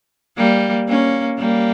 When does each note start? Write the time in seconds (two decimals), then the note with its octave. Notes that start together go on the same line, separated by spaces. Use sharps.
0.38 G3 A#3
0.88 A#3 C#4
1.38 G3 A#3